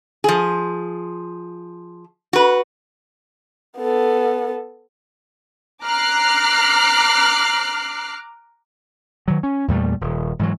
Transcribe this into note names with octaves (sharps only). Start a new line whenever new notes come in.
F3 G#4
F#4 B4
B3 A4
A#5 D6 F6 F#6 C7
D#3 F#3
C#4
E2 A#2 G3 A3
D#1
G#2 E3 F#3